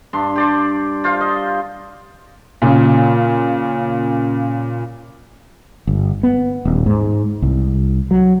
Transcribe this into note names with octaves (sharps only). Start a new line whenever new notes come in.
G2 D4 C6
G4 D5 C6
F4 C5 F5
D#5
A#2 C#3
G1
B3
D#1
G#2
C2
F#3